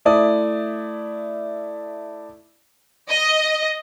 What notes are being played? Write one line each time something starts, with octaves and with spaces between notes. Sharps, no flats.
A3 E4 D5 D#6
D#5